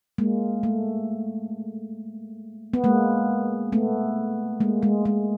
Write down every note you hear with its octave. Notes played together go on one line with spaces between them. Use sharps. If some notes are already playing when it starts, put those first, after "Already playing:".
G#3 A#3
A3
B3
G#3 A#3
A3 B3
G#3 A#3
G#3
G#3